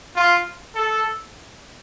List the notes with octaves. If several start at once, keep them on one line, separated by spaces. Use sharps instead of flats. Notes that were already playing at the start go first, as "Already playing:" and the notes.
F4
A4